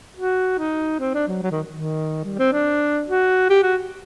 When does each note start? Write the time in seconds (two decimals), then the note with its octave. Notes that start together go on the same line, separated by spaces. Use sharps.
0.17 F#4
0.59 D#4
1.00 C4
1.14 D4
1.28 F#3
1.42 F#3
1.51 D#3
1.71 D#3
2.24 G3
2.39 C4
2.52 D4
3.08 F#4
3.49 G4
3.63 F#4